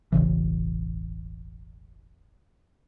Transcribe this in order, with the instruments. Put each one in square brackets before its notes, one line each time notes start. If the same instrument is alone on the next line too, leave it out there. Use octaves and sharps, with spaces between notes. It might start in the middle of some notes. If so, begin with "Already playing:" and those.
[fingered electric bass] E1 A1 C#3 E3